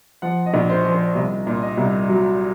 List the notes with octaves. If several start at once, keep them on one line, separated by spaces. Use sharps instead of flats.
F3 F#5
D#5
A#1
C5
F3
C5
C2 D#5
A#2
D#5
C2
F#3